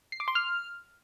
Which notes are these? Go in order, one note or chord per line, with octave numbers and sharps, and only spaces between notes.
C7
D6
C6
F6